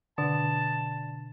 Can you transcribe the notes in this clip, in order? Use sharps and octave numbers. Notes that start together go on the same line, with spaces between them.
B2 D3 A5